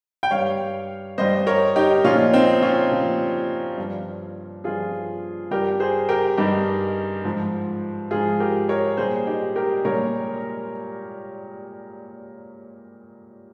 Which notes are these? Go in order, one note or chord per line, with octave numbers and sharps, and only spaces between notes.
G5
G2 G3 C#5 F5
G2 G3 C5 D#5
A#4 C#5
D#4 G4
A#2 F3 C#4 F4
C4 D#4
C#4 F4
A#2 F3
G2 F3
G2 F3 F4 G#4
G2 G3 G4 A#4
G#4 C5
G4 A#4
G2 G3 D#4 G4
G#2 F3
G#2 F3 F4 G#4
G4 A#4
A#4 C#5
A#2 G3 G#4 C5
D#4 G4
G4 A#4
A#2 G3 A#4 C#5